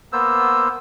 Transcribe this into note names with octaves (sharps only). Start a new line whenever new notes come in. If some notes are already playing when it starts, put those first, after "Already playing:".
A#3 B3 C5 E6